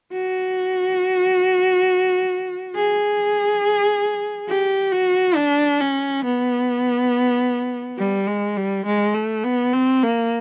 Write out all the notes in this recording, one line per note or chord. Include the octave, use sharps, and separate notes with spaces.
F#4
G#4
G4
F#4
D4
C#4
B3
G3
G#3
G3
G#3
A3
B3
C4
A#3